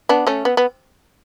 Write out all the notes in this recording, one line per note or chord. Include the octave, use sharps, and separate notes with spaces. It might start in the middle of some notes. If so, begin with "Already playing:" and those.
B3 D4
A3 C#4
B3
B3